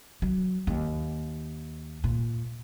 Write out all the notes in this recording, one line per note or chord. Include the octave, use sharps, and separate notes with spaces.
F#3
D#2
A#2